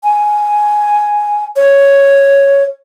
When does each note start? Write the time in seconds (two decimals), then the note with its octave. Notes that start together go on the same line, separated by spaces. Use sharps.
0.04 G#5
1.56 C#5